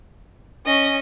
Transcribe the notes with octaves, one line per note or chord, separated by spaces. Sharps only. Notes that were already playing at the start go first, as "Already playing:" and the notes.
C#4 D#5